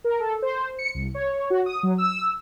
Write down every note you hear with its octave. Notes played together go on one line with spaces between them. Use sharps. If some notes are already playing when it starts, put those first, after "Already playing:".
A#4
A4
C5
C#7
C2
C#5
F#4
D#6
F#3
E6